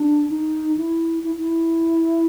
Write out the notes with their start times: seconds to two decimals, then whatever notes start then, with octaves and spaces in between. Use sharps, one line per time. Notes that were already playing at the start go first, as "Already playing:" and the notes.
Already playing: D4
0.30 D#4
0.77 E4
1.24 E4
1.39 E4